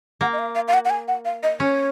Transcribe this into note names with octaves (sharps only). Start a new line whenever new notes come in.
A#3 F#5
D#5
F5
F5
F5
F#5
F#5
G#5
F#5
F5
D#5
C#4 C#5